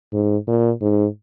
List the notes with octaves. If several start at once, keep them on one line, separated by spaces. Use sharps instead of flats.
G#2
A#2
G#2